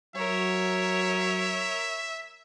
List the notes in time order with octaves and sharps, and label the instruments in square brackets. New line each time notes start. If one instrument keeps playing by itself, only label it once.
[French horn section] F#3 [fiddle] A#4 C#5 [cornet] E5